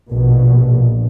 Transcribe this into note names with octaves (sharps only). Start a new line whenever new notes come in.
A#1 B2